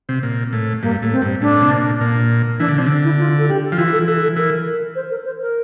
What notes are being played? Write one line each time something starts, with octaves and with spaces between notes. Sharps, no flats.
C3
A#2
A2
G2 A#3
A2
C4
G2
A2 D4
C3
A#2
A#2
E3 D4
D3
D4
C3
D3
E4
F4
A4
G4
F3
E3 F4
A4
E3 A4
A4
E3 A#4
C5
A#4
C5
A#4